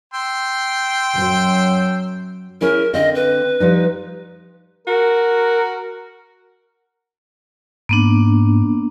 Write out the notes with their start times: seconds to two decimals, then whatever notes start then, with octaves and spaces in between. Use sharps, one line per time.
0.14 G5 C6 E6
1.14 F#2 F#3
2.61 C#4 E4 G#4 A#4
2.94 D3 C4 D#5 F5
3.15 B4
3.60 F3 G3 D#4
4.87 F#4 A#4
7.89 G#2 A#3 B3 D4